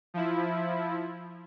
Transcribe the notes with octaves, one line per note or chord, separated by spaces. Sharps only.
F3 E4